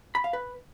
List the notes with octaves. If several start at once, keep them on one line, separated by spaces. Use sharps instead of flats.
B5
F5
B4